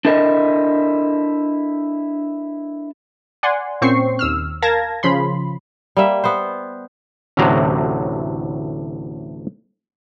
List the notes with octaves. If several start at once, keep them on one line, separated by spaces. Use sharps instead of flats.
D4 E4 A4 A#4 D#5
D5 F#5 G#5 C6
A#2 C4 C#4 C5 C#6 C7
D#2 E6 F6
A#4 F5 A5 G#6 A#6
C#3 F3 B5 C6
G3 A#3 E5
B3 C5
A1 D2 A2 C3 F#3 A#5